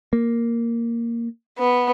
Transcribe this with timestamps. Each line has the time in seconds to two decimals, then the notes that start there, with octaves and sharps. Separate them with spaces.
0.13 A#3
1.58 B3